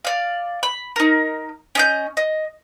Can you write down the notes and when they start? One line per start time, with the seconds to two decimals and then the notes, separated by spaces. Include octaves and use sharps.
0.05 D5 F5
0.63 B5
0.96 D#4 A#4
1.75 C#4 D#5 G6
2.17 D#5